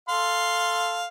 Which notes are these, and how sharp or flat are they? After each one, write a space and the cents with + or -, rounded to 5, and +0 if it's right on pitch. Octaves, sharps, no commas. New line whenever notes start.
A4 +0 F5 +0 C6 +0